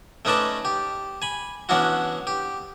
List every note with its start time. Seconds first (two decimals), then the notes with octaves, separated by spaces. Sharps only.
0.25 A3 C#4 D#4 B4 D5 A5
0.65 G4
1.22 G#5 B5
1.69 E3 B3 C#4 D4 E4 F#4
2.27 G4